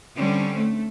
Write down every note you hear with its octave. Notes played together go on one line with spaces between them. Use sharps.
D3 G3 C4 C#4
A3